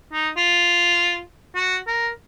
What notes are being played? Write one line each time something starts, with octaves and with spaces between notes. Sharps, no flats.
D#4
F4
F#4
A#4